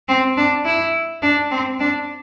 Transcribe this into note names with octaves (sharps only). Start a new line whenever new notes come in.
C4
D4
E4
D4
C4
D4